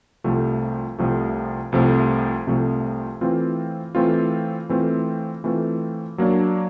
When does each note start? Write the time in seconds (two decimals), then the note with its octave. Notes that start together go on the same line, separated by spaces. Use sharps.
0.24 C2 C3 F3 A3
0.99 C2 C3 F3 A3
1.72 C2 C3 F3 A3
2.47 C2 C3 F3 A3
3.21 E3 A3 C4 F4
3.95 E3 A3 C4 F4
4.69 E3 A3 C4 F4
5.44 E3 A3 C4 F4
6.18 F#3 A#3 D4